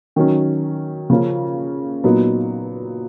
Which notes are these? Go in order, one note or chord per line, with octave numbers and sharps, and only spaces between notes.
D#3 F#3 C#4
C#3 F3 A#3 C#4
A#2 F#3 B3 D#4